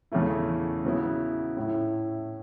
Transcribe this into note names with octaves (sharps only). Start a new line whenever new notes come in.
E2 C#3 A3 E4
C#3 F#3 B3 E4
A2 A3 E4